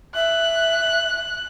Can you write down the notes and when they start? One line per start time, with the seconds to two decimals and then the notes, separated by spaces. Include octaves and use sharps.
0.15 E5 F#6